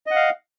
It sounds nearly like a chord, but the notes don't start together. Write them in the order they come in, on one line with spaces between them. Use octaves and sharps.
D#5 F#5 F5